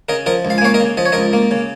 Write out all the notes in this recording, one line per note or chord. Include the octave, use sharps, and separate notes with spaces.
C#3 A#4 D#5
F3 A#4 D#5
C#2
F5
G#5
A#3 C#5 F5
A#4 D#5
C#3
F3 D#5
C#5
C#2 A#4 D#5
A#3
C#3